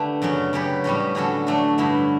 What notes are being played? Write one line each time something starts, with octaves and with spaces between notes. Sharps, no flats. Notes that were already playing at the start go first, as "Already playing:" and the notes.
Already playing: D3 A3 G4 B4
F#2 C#3 F#3 C#4
C#3 F#3 C#4 G4 B4
A2 G3 C#4 F#4
D3 F#3 C#4 F#4 A4
F#3 A3 D4 F#4
G2 D3 A3 E4